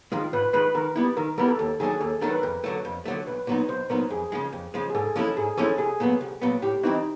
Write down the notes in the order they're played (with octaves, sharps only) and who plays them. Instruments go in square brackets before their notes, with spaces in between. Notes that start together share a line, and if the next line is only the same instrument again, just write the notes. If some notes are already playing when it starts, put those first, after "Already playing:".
[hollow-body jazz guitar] D#3 G#3 [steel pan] F4
[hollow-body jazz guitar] G#2 [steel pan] B4
[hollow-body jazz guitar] D#3 G#3 [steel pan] B4
[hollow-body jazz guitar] D#3 [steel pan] A#4
[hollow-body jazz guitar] G3 B3 E4
[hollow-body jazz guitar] D#3 [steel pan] A#4
[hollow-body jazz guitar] G3 B3 E4 [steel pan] A#4
[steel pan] A4
[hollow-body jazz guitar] D#2 [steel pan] A4
[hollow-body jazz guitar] D#3 F#3 A3 D4 [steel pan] G#4
[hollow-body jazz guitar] D#2 [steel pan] A4
[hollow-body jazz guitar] D#3 F#3 A3 D4 [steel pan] A#4
[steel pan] B4
[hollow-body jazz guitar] F2 [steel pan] A#4
[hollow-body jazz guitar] D3 F#3 A3
F2
D3 F#3 A3
[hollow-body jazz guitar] B1 [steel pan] B4
[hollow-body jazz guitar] A#2 F#3 B3 D#4
[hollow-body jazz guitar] B1 [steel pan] C5
[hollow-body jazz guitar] A#2 F#3 B3 D#4 [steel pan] A#4
[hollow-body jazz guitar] F2 [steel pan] G#4
[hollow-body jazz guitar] C#3 F3 G#3
F2
C#3 F3 G#3
[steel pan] G#4
[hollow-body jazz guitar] G#2 [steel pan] A4
[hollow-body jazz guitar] F3 G#3 C#4 E4 [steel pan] A4
[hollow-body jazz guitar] G#2 [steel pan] G#4
[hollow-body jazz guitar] F3 G#3 C#4 E4 [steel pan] A4
[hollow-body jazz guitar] C2 [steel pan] G#4
[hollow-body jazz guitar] A#2 F#3 B3
C2
A#2 F#3 B3
[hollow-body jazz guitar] A2 [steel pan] G4
[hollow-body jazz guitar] E3 G3 C4 E4 [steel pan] D#4